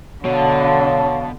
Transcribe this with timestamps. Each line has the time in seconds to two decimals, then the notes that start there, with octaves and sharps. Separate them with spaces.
0.25 B2 D3 F#3 F5 A5